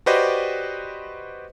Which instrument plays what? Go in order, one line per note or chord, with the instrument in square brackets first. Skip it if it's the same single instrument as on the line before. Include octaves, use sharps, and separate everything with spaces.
[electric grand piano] F#4 G4 B4 C5 D5 D#5